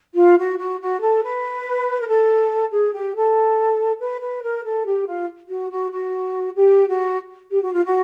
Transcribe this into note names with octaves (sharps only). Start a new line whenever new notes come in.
F4
F#4
F#4
F#4
A4
B4
A#4
A4
G#4
G4
A4
B4
B4
A#4
A4
G4
F4
F#4
F#4
F#4
G4
F#4
G4
F#4
F4
F#4